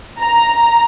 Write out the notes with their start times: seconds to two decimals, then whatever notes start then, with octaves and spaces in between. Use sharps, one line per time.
0.21 A#5